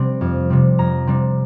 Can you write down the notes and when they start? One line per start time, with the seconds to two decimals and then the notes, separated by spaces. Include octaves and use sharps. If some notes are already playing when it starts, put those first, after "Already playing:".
Already playing: C3 G3 C4
0.21 F2
0.50 C3 G3 C4
0.78 F2 A#5
1.07 C3 G3 C4